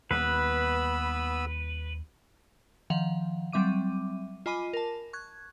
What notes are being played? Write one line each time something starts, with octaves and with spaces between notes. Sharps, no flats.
D#2 G3 B3 B4 B5 E6
D#3 F3 F5 F#5
F#3 G3 C4 E5 D6 D#7
F4 D#5 G#5 B5 D6 D#7
A#4 A5
C#6 F#6 G#6